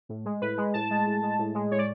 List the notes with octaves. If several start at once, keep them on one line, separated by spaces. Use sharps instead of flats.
A2
G#3
A2 B4
G#3
A2 A5
G#3
A2
G#3
A2
G#3
A2 C#5
D5